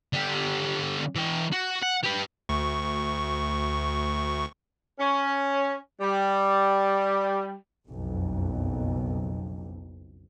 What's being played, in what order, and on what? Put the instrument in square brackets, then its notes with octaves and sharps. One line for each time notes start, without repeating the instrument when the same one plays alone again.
[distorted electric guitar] D3 G4
E3 G5
F#4
F#5
G4 B4
[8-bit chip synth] D2 C#6
[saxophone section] C#4
G3
[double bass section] F#1 B1 F2